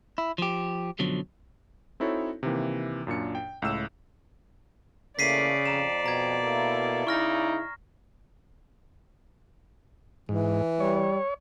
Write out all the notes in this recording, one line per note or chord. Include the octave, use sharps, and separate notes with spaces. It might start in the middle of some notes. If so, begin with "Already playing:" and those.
E4
F3 G4
F#2 B2 D3 F3 F#3
C4 D#4 E4 F#4 A4 C#5
C3 D#3 E3 A#3
F#2 A#2 D4 C#7
G5
C#2 A2 E6 E7
C#3 E3 A3 A#3 D5 B6 C7 D#7
F2 A#5 E7
B2 A#5 G#6
A#3 E4 A4
C#3 D#4 E4 C#6 F6 A#6
G#2 E3
G3 C#5